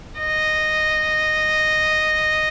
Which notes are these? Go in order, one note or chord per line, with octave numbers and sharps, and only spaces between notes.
D#5